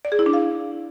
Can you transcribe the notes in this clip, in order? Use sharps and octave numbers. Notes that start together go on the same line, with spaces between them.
D5
G#4
E4
D4
F5